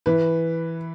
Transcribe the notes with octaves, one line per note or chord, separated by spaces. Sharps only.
E3 B4